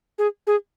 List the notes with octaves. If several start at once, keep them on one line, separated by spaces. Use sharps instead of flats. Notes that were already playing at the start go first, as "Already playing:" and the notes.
G#4
G#4